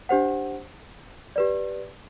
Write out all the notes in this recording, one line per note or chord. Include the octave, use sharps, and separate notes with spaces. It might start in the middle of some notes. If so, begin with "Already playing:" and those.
D4 G4 C5 F#5
G4 B4 D5